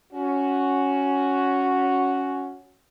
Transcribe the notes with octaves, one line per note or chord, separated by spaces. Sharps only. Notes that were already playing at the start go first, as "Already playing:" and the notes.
C#4 F#4